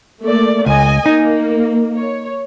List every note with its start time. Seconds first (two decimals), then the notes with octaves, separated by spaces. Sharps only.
0.22 A3 A#3 D5
0.66 C#2 D#5 G#5
1.06 A#3 D#4
1.96 C#5